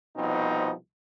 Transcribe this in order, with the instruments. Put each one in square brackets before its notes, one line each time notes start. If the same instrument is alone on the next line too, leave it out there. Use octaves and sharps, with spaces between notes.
[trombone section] C2 B2 F3 B3 C4 D#4